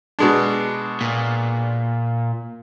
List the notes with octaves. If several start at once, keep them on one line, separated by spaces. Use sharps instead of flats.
B2 G#3 D4
A#2